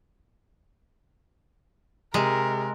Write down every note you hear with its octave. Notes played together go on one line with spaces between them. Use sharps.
C3 G#3 A#4